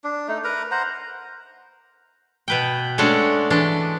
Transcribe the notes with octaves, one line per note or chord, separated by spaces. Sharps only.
D4
A3 D#4
A#4 B4 A#5
C5 F#5 A#5
B2 B4 G5
G#3 A3 C#4 D4 F#4
E3 G#3 D4